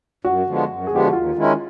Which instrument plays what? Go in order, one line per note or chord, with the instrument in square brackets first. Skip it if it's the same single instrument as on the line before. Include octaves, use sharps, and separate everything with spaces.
[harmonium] F#2 [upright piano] F#4
[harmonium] D3 F3 G#3 B3
F#2
[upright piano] G#4
[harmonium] D3 F3 G#3 B3 [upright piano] G4
[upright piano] F#4
[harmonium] D#2 [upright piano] F4
[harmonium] D#3 G#3 C#4 E4